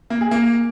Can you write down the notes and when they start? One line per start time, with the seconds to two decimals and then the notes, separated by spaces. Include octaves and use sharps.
0.10 A#3
0.21 G#4
0.31 A#3